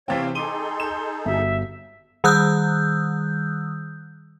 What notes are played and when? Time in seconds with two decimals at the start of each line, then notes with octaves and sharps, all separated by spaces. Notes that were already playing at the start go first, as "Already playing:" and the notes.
0.08 C3 E3 C4 C#5 F5 G5 A6 B6
0.35 D#4 G#4 A4 C6 D6 D#7 G7
0.80 G6 E7
1.25 G1 F#4 E5
2.24 D#3 G3 D#6 E6 F#6 G6